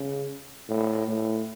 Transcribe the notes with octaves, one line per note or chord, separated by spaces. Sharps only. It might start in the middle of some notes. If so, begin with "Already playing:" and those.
Already playing: C#3
A2
A2